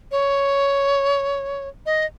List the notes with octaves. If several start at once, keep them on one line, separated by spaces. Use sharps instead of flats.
C#5
D#5